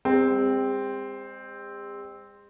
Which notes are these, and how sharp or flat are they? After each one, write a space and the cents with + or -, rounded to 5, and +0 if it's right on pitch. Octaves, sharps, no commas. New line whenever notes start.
G#3 -45 C4 +0